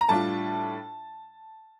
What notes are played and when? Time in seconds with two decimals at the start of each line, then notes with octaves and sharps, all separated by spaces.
0.01 A#5
0.08 A2 G3 D4 F4 A5